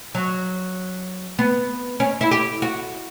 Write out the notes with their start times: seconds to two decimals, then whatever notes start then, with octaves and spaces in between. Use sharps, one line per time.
0.15 F#3
1.39 B3
2.00 C#4
2.21 E4
2.31 G4
2.62 F#4